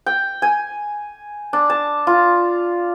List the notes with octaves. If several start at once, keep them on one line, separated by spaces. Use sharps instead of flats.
G5
G#5
D4
A5
F4